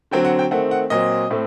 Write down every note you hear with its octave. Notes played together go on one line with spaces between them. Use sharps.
D3 F#3 C4 G5
F#5
G5
D#3 A3 C4 F#5
F#5
A#2 F#3 C4 D#5
A2 A3 C4